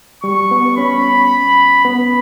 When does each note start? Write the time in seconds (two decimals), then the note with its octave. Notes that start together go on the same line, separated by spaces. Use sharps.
0.23 G3 C#6
0.51 B3
0.77 C#4 B5
1.84 B3 B5